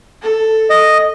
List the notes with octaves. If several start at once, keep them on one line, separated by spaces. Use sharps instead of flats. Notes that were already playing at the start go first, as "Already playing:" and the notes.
A4
D#5